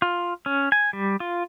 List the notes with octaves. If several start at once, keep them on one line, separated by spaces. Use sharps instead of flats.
F4
C#4
G#5
G3
F4